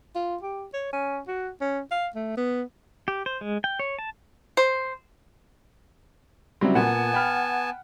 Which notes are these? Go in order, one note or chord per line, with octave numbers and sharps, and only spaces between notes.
F4
G4
C#5
C#4
F#4
C#4
F5
A3
B3
G4
C5
G#3
G5
C#5
A5
C5
C#3 F#3 G3 C4 E4
A#2 B3 F#5 G#5 A5
G5 B5 F6